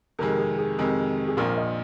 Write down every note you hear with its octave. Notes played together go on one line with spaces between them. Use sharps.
F2 C3 D#3 G#3 A#4
G#4
G#4
F2 C3 D#3 G#3
G#4
A#1 A#2 F3 A#4
D#5